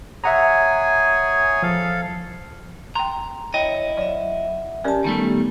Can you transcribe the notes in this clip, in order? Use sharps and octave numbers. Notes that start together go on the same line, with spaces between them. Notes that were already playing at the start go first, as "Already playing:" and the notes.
G#4 C#5 E5 F#5 G#5 A#5
F3 A4 F5
G5 A#5 C6
E4 C#5 D#5 G5
F#3 D5 E5
C#4 G4 A#4 D5 A5
D#3 G3 A3 B3